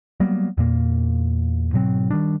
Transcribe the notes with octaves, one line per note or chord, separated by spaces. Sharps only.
F#3 G3 A#3 B3
E2 A#2 A#3
G#2 B2 F#3 C4
D#3 G3 D4